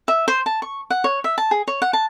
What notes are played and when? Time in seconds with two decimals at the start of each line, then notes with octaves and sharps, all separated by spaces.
0.08 E5
0.28 C5
0.46 A5
0.62 C#6
0.90 F#5
1.04 C#5
1.24 E5
1.38 A5
1.51 G#4
1.68 C#5
1.82 F#5
1.93 A5